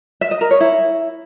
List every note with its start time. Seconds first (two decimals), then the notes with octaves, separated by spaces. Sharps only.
0.21 E5
0.31 D#5
0.41 A#4
0.51 C#5
0.61 E4